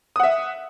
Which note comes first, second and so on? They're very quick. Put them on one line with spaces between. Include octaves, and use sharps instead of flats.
D#6 F#5 E5